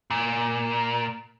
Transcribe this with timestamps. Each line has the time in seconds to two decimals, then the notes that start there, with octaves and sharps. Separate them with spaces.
0.11 A#2